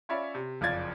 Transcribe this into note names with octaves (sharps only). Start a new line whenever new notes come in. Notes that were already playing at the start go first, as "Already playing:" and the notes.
C#4 F4 C#5 D5 E5 B5
C3
F#1 F2 F4 D5 G#6 A6